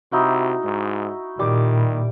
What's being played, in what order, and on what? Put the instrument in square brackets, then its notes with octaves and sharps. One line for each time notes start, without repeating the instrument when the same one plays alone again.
[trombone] C3 [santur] D#4 E4 F#4
[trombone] G#2
[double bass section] A#2 [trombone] D#3 [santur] G3 D6